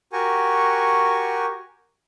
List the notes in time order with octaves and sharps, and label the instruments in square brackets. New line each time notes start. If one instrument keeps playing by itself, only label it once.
[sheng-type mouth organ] F#4 G4 A#4 G#5 C#6